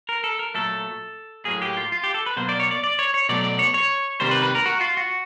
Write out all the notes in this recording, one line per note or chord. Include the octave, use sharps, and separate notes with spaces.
A#4
A4
A#4
A#2 F#3 A3 A4
A2 F#3 A#3 G#4
G4
F4
F4
G4
A4
B4
B2 F#3 A#3 C5
D5
C#5
D5
D5
C#5
C#5
B2 F#3 A3 D5
D5
C#5
C#5
C3 D#3 G3 A#3 C5
B4
B4
A#4
F#4
F4
F#4